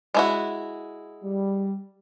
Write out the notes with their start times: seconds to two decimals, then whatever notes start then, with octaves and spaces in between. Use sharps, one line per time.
0.14 G#3 E4 F#4
1.23 G3